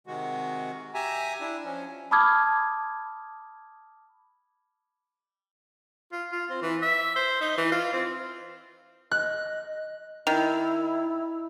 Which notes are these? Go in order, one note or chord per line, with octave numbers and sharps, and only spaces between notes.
C3 D#3 G#3 F#4
G4 E5 G#5 A#5
D4 E4
F3 C#4
A5 B5 D6 D#6 F6 G#6
F4
F4
C4
E3
E5
C5
D#4
E3
F4
C4
D#5 F#6
D#3 E4